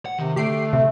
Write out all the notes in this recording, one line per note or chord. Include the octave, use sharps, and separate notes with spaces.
F#5
C3 D#3
D3 A3 G4 C7 D7
C3 E5